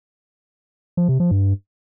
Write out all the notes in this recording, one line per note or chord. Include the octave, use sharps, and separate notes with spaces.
F3
C3
F3
G2